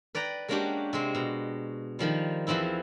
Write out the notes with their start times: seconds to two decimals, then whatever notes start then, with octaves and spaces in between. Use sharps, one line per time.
0.15 B4 D5 G5 A#5
0.48 G#3 A#3 C#4 D4 F#4 G4
0.93 C3 G#3 C4
1.15 B2
1.99 D#3 F3 G3
2.47 E2 E3 F3 C4 E4